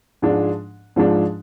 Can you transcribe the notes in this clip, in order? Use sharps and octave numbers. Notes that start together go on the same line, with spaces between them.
G#2 F3 G#3 D4
G#2 F3 G#3 D4